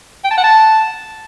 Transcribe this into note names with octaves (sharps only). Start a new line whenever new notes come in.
G5
A5
F#5
A5